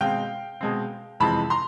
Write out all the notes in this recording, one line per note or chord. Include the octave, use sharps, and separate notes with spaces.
B2 G#3 C4 F5 G5
B2 G#3 C4
F2 C3 E3 G#3 C4 A5 B5
A#5 C6